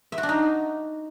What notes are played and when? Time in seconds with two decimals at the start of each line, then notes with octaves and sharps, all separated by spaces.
0.12 E5
0.18 F#4
0.23 D4
0.29 D#4